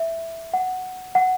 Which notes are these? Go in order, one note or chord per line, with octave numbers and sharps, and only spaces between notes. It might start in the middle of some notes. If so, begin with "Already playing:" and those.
Already playing: E5
F#5
F#5